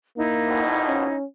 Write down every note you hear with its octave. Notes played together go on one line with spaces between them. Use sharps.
A#3 D#4 E4
A#1 F2 B2
C#4